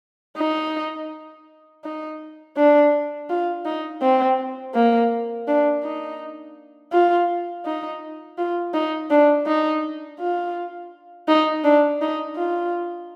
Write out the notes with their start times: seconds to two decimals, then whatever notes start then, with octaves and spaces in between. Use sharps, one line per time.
0.38 D#4
1.84 D#4
2.57 D4
3.30 F4
3.65 D#4
4.02 C4
4.75 A#3
5.48 D4
5.84 D#4
6.92 F4
7.66 D#4
8.38 F4
8.74 D#4
9.11 D4
9.46 D#4
10.20 F4
11.28 D#4
11.64 D4
12.01 D#4
12.37 F4